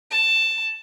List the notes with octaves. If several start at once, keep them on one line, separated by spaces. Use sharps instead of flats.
A5